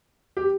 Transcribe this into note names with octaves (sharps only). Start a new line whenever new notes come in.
G4